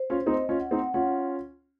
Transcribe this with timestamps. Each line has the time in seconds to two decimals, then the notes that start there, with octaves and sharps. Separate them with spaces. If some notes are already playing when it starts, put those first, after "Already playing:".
Already playing: C5
0.10 C#4 F4
0.26 C4 D#4 D#5
0.49 C#4 F4
0.60 F#5
0.71 C4 D#4
0.94 C#4 F4 F#5